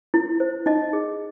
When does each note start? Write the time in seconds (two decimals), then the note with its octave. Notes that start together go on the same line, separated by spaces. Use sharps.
0.14 E4
0.40 C5
0.66 D#4 D#5
0.93 G#4